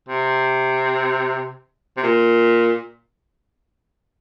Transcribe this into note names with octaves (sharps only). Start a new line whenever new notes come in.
C3
C3
A#2